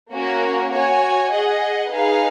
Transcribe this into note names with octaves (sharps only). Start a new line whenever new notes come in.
A#3 C#4 F#4 A#4
F#4 C#5 G#5
G#4 D#5 F#5
D#4 G#4 B4 F5